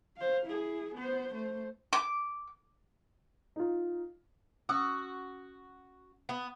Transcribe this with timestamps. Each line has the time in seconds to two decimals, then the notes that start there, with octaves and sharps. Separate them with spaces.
0.17 C5 F5
0.46 E4 G#4
0.95 B3 C5
1.34 A3 C5
1.93 D6
3.56 D#4 F4
4.69 C#4 F#4 D#6 E6
6.29 B3